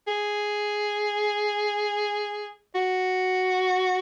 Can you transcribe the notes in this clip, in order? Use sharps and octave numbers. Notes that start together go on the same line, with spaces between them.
G#4
F#4